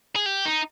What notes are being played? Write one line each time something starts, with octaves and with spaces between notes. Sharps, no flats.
G#4
G4
D#4